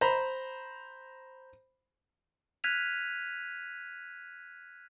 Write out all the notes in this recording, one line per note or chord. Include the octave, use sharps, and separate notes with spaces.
C5 A#5 B5
F6 F#6 G#6 B6 D#7 F7